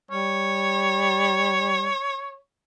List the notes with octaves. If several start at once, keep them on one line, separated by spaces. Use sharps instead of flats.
G3 C#5